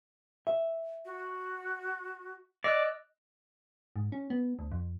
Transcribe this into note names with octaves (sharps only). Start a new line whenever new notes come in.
E5
F#4
D5 D#5 E6 F#6
G#2
C#4
B3
D2
F2